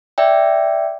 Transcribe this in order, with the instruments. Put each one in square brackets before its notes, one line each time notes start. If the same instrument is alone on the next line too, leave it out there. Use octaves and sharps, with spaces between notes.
[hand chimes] D5 E5 G5